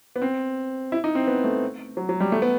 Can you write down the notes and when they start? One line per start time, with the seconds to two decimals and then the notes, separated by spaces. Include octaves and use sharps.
0.16 B3
0.22 C4
0.92 E4
1.04 D#4
1.15 C4
1.27 B3
1.44 A3
1.97 F#3
2.09 F#3
2.20 G3
2.32 A3
2.42 B3